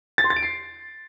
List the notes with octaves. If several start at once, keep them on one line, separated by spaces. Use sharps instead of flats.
A6
C6
A6
D7
C7